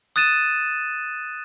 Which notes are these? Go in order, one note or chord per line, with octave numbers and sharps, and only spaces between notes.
D#6 F#6 A6 D#7 E7